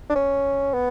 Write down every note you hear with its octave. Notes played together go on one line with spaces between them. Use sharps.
D4
C#4
B3